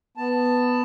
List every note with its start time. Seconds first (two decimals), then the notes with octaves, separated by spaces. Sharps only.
0.17 B3 A5